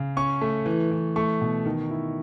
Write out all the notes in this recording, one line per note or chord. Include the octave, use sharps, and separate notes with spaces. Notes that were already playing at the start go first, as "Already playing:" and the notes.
Already playing: C#3
C#4 C#6
A3
E3
E3
A3 C#6
B2
D#3
E4